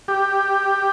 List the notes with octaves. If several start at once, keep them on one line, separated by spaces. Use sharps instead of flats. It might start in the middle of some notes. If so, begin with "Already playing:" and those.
G4